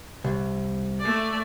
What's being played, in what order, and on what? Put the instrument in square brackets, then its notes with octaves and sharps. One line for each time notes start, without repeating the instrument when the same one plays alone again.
[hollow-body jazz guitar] C2
[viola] A3 D5